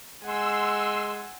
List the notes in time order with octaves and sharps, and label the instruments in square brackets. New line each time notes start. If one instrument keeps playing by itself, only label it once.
[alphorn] G#3 [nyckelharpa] F#5 G#5 [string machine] C6 E6